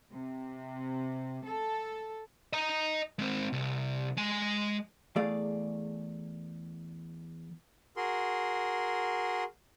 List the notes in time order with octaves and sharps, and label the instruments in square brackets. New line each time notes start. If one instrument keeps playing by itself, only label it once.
[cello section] C3
A4
[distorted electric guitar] D#5 A#5
G#3 C4
C2
G#3 G#5
[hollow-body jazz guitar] E2 A3 G#4 D5 F5
[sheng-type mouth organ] F#4 G#4 A#4 C6